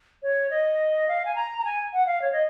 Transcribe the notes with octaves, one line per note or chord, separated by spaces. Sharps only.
C#5
D#5
F5
G#5
A#5
A#5
G#5
F#5
F5
C#5
D#5